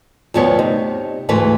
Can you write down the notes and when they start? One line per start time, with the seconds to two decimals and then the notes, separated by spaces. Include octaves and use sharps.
0.34 D2 G2 F3 B3 B4 C#5
0.59 C3 D#4
1.29 D2 G#2 E3 A3 E4 B4